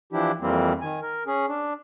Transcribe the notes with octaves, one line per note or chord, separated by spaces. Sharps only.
E3 F3 D4 E4 G4
F2 E3 G3 A#3 C4
D#3 G#5
A#4
C#4 G#4
D4